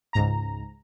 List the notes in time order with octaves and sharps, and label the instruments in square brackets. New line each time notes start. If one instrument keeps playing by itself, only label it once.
[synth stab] C#2 G#2 A#5